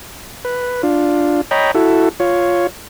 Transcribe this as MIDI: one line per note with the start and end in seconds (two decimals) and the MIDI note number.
0.45 0.82 71
0.83 1.41 62
0.83 1.41 65
1.51 1.71 73
1.51 1.71 75
1.51 1.71 79
1.51 1.71 82
1.51 1.71 83
1.75 2.09 64
1.75 2.09 66
1.75 2.09 69
2.20 2.67 65
2.20 2.67 73